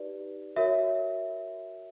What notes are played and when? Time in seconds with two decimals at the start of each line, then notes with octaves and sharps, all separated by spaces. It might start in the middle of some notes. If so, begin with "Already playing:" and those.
Already playing: D#4 G4 B4 D5
0.56 F#4 A#4 C#5 E5